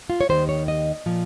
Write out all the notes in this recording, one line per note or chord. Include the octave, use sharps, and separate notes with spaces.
F4
C#5
D#2 D#3 G3 C5
C#5
D#5
A#2 F3